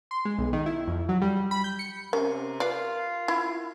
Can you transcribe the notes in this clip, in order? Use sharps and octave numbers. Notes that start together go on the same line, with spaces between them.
C6
G#3
B1
D#3
E4
F2
F#3
G3
B5
G6
C#7
C3 C#4 A#4
F4 B4 D5
E4